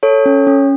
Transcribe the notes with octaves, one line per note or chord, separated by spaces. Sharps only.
A4 C#5
C#4
C#4